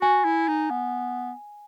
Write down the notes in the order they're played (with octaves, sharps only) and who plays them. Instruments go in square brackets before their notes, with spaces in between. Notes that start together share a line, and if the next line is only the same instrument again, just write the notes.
[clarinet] F#4 [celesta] G#5
[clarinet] E4
D#4
B3